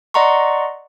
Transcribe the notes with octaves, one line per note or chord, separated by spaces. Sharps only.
D5 D#5 F#5 A#5 C6 C#6